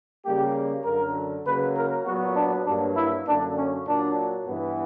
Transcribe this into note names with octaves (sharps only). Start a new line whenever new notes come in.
C#3 G3 A#3 G4
F#2 D3 F#3 A#4
C#3 F#3 A#3 B4
A#4
A#2 F#3 B3 F#4
D4
G2 F#3 A#3 D4
E4
F#2 D3 A#3 D4
C#4
A#2 F#3 A#3 D4
G2 E3 B3